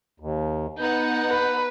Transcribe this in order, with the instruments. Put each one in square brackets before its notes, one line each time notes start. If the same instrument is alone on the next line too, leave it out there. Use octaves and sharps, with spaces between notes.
[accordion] D#2
[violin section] B3 D#4 F#5 [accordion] G6
[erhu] B4